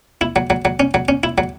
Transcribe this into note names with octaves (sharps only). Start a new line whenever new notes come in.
E4
F#3
F#3
F#3
C#4
F#3
C#4
E4
F#3